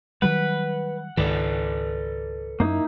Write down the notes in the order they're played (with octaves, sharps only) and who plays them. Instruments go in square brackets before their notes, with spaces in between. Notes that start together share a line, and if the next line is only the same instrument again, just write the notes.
[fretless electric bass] D#3 F#3 G3 [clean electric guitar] B4 [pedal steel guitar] F#5
[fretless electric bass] C#2 G#2 D#3 [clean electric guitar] A4 B4 D5
[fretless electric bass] F#2 [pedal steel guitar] A#3 D#4 E4